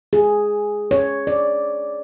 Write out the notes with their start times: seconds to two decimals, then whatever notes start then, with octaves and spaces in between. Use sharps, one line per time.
0.13 G#4
0.91 C#5
1.27 D5